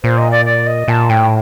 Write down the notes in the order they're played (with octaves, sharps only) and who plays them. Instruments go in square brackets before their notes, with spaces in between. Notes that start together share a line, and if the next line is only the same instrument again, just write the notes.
[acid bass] A#2 [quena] C5
[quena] D#5
D5
D5
D#5
[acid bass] A#2 [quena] A5
[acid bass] A2 [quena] G5